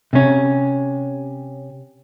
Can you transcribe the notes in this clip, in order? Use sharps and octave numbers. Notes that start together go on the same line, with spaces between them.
C3 C#4